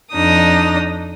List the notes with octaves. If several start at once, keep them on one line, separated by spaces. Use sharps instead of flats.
F2 D4 D#4 D#6